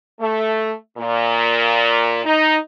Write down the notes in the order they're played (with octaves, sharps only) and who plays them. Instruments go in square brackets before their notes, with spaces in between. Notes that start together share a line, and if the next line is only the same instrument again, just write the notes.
[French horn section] A3
A#2
D#4